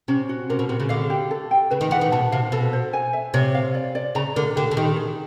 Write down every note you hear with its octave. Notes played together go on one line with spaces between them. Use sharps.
C3 C#4
F#4
C3 A#4
B2
C3 F#4
C#3
D3 F5
G4
A4
G5
C#3 B4
D#3
E3 F#5
D#3
B2 A5
C3 F5
B2 A4
C5
G#5
E5
C3 C#5
F5
D5
D5
C#3 A#5
D3 A#4
D3 G4
D3
D#3 G4
G#4